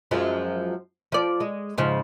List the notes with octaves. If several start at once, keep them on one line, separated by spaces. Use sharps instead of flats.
F#2 F3 G#3
F3 D5
G#3
G#2 C#3 F3